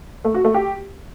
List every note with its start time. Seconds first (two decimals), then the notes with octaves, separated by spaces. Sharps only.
0.25 A3
0.34 F#4
0.44 A3
0.54 G4